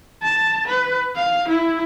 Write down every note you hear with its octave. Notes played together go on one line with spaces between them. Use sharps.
A5
B4
F5
E4